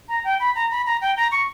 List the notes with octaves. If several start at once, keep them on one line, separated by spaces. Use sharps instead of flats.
A#5
G5
B5
A#5
B5
A#5
G5
A#5
C#6